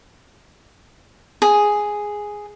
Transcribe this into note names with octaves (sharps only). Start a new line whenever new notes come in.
G#4